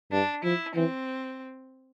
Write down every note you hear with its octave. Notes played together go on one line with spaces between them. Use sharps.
G2 D4
F3 E4
E3 C4